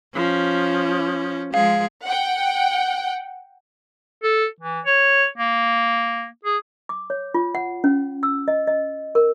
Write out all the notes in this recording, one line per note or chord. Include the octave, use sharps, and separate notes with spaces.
F3 C#4
F3 G#3 G#4 F5
F#5 G5
A4
E3
C#5
A#3
G#4
D6
C#5
F4
F#5
C#4
E6
D#5
D#5
A#4